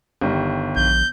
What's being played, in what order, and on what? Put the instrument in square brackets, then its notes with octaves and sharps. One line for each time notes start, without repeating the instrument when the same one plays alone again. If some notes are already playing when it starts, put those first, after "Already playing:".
[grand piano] G1 D#3 G3
[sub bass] A#1 [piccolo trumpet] G6